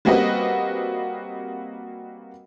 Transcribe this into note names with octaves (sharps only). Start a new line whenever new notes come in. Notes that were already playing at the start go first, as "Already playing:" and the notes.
G3 A#3 C4 F#4 B4 D#5